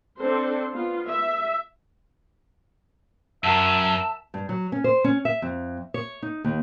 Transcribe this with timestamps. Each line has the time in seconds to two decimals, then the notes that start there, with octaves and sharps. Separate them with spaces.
0.20 C4 D4 A4 C5
0.72 B3 F4
1.09 E5
3.44 F#2 F#4 A#4 E5 A5
4.34 G2
4.49 F#3
4.72 C#4
4.84 C5
5.04 C#4
5.25 E5
5.42 F2
5.94 C#5
6.22 D#4
6.44 D#2